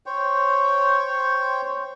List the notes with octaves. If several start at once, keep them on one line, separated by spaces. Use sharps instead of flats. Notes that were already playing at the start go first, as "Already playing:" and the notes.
C5 C#5 G5